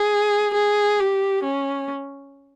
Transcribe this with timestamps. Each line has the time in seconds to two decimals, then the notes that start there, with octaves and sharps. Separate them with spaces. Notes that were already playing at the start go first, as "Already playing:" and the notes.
Already playing: G#4
0.54 G#4
1.00 G4
1.44 C#4